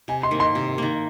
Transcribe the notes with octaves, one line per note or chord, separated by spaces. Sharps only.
C3 G#5
C6
D#3 A#3
C6
C3
D#3 A#3